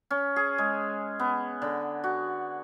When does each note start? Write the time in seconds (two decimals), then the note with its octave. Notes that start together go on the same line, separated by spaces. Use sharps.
0.11 C#4
0.36 G#4
0.58 G#3
1.19 B3
1.62 D3
2.04 F#4